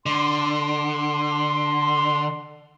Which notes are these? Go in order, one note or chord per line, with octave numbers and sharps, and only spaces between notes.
D3 C6